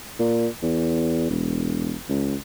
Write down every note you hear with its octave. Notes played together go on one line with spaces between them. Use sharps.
A#2
E2
E1
C#2